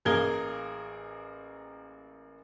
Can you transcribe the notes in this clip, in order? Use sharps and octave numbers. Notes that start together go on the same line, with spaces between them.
A1 A#3 G#4 A#4 G#6 G7